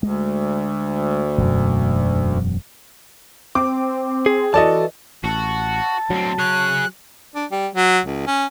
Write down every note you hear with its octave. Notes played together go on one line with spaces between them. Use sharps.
D2 G#3
E1 F#2 B2
C4 D6
G#4
E3 F#4 A4 D5 D#5 A5
A1 F#4 A5
D2 F#3 C4
G#4 C#5 F#6
D4
G3
F#3
C#2
C#4